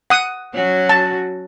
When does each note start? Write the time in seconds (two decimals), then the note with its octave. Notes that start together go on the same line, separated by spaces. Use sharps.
0.10 F#5 D#6
0.54 F#3 C#4 F#4
0.89 A5